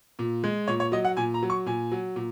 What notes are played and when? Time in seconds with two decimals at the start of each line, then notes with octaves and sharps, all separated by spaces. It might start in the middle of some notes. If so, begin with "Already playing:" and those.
0.19 A#2
0.44 G#3
0.68 A#2 C#5
0.80 C#5
0.92 F#3 D#5
1.05 F#5
1.17 A#2 G#5
1.34 A#5
1.43 F#3
1.50 C#6
1.66 A#2 G#5
1.92 F#3
2.16 A#2